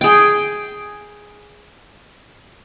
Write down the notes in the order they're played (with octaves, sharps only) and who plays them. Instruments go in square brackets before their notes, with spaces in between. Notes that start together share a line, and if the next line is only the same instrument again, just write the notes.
[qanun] G#4 G5